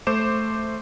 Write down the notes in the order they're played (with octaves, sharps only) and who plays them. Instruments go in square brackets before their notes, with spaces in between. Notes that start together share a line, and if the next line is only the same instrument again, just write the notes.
[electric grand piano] A3 C5 D6 E7